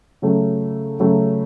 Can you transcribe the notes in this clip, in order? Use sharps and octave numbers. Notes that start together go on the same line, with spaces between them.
C#3 F#3 A3
C#3 F#3 A3